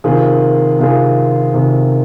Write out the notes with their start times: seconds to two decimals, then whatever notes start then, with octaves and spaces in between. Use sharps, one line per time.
0.04 C3 D#3 C4 F4 G#4
0.79 C3 D#3 C4 F4 G#4
1.54 C3 D#3 C4 F4 G#4